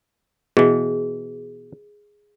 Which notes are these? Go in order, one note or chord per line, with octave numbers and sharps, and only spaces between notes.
B2 E3 G#4